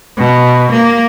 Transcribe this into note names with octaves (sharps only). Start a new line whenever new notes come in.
B2
A#3